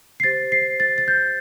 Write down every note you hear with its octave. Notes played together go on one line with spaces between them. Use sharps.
C7
G4 C5 A6
C7
A6
A6
G6